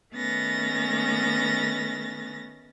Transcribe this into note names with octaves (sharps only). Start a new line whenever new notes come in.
D#3 A3 B3 C#4 A6 A#6